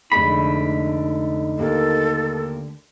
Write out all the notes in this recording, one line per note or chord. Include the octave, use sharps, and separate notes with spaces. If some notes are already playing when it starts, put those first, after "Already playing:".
F1 D3 G#3 A3 D#4 B5
D#2 A#3 A4